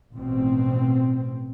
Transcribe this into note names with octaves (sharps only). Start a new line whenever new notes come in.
A1 B2 C4